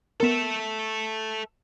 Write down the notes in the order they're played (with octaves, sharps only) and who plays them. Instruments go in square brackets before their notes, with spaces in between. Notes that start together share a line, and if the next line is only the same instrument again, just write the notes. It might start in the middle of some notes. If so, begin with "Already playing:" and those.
[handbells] B3 A#4 [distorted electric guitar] A4 E5